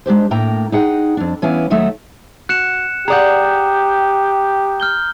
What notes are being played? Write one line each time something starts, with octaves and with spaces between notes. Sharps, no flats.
G#3 D4 G4 C5
A2 A3 A#3 G5 A#5
D#4 G#4 F#5 G5
F2 D4
E3 B3 C#4 E4 F5 G#5
D#2 F#3 A3 D#4 E5 F#5
F#4 F#6 C#7 E7
G4 G#4 D5 F#5 A#5 D#6 G6
F6 G6 G7